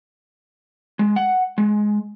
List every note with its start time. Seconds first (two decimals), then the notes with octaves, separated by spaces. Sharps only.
0.99 G#3
1.16 F#5
1.58 G#3